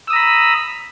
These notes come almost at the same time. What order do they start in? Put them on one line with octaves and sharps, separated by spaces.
E6 D#6 A#5 B5